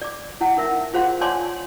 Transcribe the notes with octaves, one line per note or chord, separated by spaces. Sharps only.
D5 D6
E4 F#5
D#4 A#4 E5
F4 G#4 C5 F5 F#5 C6
C#5 D5 G#5 A5 C6 D6